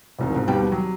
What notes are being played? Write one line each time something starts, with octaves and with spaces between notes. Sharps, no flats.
E1 C2 D#3
C#2 G#2
D#2 B2 G3 G4 G5 A5
F#3